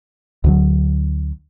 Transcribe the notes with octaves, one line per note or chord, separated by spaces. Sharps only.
D2 D3 F#3